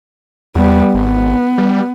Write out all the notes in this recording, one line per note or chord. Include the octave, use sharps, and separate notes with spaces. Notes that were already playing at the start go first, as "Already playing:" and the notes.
E2 G3 B3
G#1 B3
G3